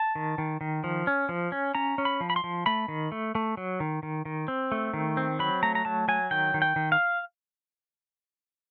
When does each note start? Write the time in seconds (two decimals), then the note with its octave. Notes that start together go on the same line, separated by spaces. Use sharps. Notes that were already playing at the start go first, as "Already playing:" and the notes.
Already playing: A5
0.15 D#3
0.38 D#3
0.61 D#3
0.84 F3
1.07 C#4
1.29 F3
1.52 C#4
1.75 C#4 A#5
1.98 C#4
2.05 B5
2.21 F3
2.30 B5
2.36 C6
2.44 F3
2.66 A3 B5
2.88 D#3
3.12 A3
3.35 A3
3.57 F#3
3.80 D#3
4.03 D#3
4.25 D#3
4.48 C4
4.72 A3
4.94 D#3
5.17 C4
5.39 F#3 B5
5.63 A3 A#5
5.75 A#5
5.85 F#3 A5
6.08 F#3 G#5
6.31 D#3 G5
6.54 D#3
6.62 G5
6.76 D#3
6.92 F5